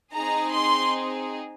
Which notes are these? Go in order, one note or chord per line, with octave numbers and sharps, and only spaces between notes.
C4 D#4 G#4 A#5
C6